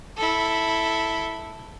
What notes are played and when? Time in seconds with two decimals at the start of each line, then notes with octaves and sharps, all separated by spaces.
0.17 E4 A4